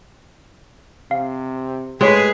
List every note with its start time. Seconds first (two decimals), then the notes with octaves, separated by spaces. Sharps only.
1.11 C3 F5
2.01 A2 G#3 G4 G#4 B4 C#5 C6